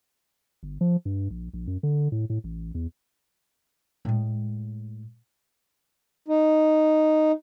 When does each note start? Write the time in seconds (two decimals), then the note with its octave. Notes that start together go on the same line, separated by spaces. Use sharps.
0.63 G1
0.81 F3
1.05 G2
1.30 A#1
1.53 A#1
1.67 F#2
1.83 D3
2.12 A2
2.30 A2
2.44 A1
2.75 E2
4.05 A2 G#3
6.28 D#4